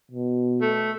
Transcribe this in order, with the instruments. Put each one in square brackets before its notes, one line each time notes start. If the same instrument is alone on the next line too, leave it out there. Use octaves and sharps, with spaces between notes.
[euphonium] B2
[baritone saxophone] A3